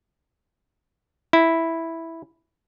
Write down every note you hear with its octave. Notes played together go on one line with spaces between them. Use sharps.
E4